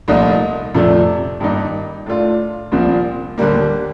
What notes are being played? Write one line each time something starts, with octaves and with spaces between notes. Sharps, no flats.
C2 A#2 F3 A3 D#4
F2 C3 F3 A3 D4
G2 D#3 A#3 D#4
A2 A3 D4 F4
C2 A#2 F3 C4
D#2 D3 G3 A#3